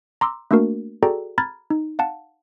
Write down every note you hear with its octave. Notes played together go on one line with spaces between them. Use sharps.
A#5 C6 D6 E6
A3 A#3 D4 F#4 A#4
F#4 G#4 A4 D5 G5 A#5
A#5 B5 F6 G#6 A6
D#4
F5 F#5 A5